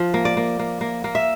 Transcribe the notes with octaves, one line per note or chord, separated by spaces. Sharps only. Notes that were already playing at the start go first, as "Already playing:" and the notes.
Already playing: F3
A#3
D5
A#3
A#3
A#3
A#3
E5